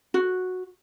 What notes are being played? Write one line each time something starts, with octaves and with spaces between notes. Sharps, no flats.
F#4